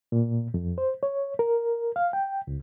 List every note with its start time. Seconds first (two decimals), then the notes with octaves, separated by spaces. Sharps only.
0.12 A#2
0.54 F2
0.78 C5
1.03 C#5
1.39 A#4
1.96 F5
2.13 G5
2.47 C#2